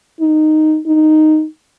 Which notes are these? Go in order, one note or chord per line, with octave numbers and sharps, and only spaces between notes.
D#4
D#4